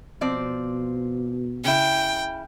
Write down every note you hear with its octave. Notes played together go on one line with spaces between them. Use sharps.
B2 F3 C4 D5
C#3 E4 G5